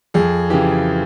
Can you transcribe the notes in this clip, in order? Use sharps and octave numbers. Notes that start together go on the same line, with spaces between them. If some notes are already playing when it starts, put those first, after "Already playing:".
F2 G#4
C#3 E3 G4